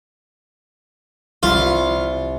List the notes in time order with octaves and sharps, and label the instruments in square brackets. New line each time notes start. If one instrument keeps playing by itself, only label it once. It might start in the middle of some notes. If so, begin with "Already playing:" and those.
[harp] C2 B6 [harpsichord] F4